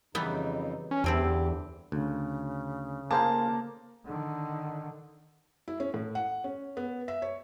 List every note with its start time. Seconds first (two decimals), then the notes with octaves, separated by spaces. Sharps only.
0.15 F2 C#3 E3 G3 B3 D#4
0.91 C#4 C#5
1.04 E2 D3 C4 E4 G4
1.92 D2 C#3
3.11 A#3 G#4 C5 F5 A5
4.06 D3 D#3
5.68 E4
5.80 C#4
5.94 A2
6.15 F#5
6.44 C#4
6.77 B3
7.08 E5
7.22 C#5